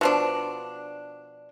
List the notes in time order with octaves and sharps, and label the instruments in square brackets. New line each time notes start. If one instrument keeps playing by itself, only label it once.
[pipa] B2 F3 D4